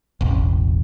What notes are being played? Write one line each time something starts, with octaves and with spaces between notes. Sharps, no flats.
E1 A1